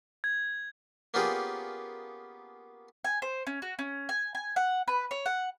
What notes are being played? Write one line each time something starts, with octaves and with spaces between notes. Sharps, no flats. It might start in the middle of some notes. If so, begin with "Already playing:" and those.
G#6
A#3 B3 C#4 F4 G4 G#4
G#5
C5
C#4
F#4
C#4
G#5
G#5
F#5
B4
C#5
F#5